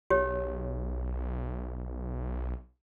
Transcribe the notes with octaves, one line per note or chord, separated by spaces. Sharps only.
B1 G4 C#5